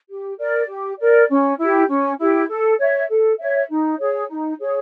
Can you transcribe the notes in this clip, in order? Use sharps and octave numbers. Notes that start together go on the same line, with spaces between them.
G4
A#4 D5
G4
A#4 D5
C#4
E4 G4
C#4
E4 G4
A4
C#5 E5
A4
C#5 E5
D#4
G#4 C#5
D#4
G#4 C#5